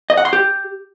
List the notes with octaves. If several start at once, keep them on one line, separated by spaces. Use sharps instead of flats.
D#5
F#5
C6
G4